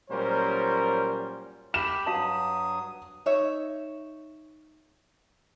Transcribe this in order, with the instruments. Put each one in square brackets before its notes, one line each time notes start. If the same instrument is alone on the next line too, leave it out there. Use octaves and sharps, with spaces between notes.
[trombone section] A#2 F#3 G3 C#4 A#4 C5
[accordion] G4 B5 [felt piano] E7
[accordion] G2 F#3 D#6 [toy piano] F#4 F5 A5
[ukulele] D#4 C#5 E5